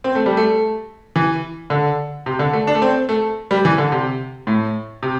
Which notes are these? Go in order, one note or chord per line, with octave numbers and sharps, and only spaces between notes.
C4
A3
G3
A3
E3
D3
C3
D3
A3
D4
A3
C4
A3
G3
E3
D3
C3
A2
C3